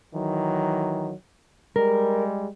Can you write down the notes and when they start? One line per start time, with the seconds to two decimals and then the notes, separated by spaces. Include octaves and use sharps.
0.14 D#3 E3 F#3
1.76 G3 G#3 A#4